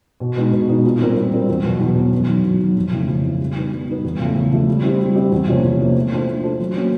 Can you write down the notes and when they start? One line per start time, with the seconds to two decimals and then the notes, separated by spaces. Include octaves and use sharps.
0.20 B2
0.36 G#3 B3 D#4
0.52 B2
0.69 G#3 B3 D#4
0.85 A#2
1.01 G3 C4 F4 A#4
1.16 A#2
1.32 G3 C4 F4 A#4
1.49 E2
1.64 B2 F#3 B3
1.80 E2
1.96 B2 F#3 B3
2.12 F#2
2.28 D#3 F#3
2.45 F#2
2.60 D#3 F#3
2.77 F2
2.92 C#3 E3 A3
3.08 F2
3.24 C#3 E3 A3
3.40 G3
3.55 B3 D#4
3.72 G3
3.88 B3 D#4
4.04 E2
4.19 C#3 F3 A3
4.36 E2
4.51 C#3 F3 A3
4.67 G3
4.83 C4 E4 G4
5.00 G3
5.15 C4 E4 G4
5.31 E2
5.48 C3 F3 A#3 C#4
5.64 E2
5.80 C3 F3 A#3 C#4
5.96 A3
6.11 D4 F4 A4 C5
6.27 A3
6.43 D4 F4 A4 C5
6.60 F#3
6.75 A#3 C#4 F#4